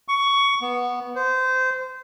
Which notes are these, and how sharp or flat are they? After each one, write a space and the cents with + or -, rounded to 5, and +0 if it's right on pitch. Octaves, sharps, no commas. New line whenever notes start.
C#6 +15
B3 -10
C5 -20